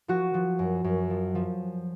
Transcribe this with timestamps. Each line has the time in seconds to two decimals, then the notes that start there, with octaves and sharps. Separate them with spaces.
0.08 F3 F#4
0.34 F3
0.59 F#2
0.84 F#2
1.10 F3
1.35 F3